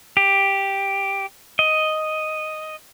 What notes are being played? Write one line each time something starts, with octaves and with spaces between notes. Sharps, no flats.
G4
D#5